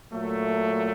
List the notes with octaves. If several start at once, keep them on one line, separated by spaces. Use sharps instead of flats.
A#2 F#3 A3